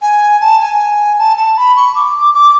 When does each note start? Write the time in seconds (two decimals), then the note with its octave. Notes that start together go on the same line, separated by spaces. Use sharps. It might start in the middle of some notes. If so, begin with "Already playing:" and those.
0.02 G#5
0.41 A5
0.60 G#5
1.19 A5
1.37 A5
1.57 B5
1.76 C#6
1.95 D6
2.34 D6